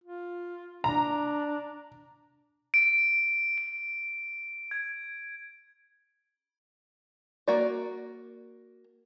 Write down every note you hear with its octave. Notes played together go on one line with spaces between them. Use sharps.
F4
D4 A#5
D7
D7
G#6
A#3 F#4 D5